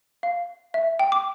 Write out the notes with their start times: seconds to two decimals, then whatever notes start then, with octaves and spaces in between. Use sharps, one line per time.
0.23 F5
0.74 E5
0.99 G5
1.12 D6